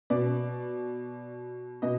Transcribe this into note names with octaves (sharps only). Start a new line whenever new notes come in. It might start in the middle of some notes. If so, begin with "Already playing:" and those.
B2 D5
B2 D#5